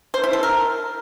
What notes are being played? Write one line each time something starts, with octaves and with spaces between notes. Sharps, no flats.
C5
E4
A4
A#4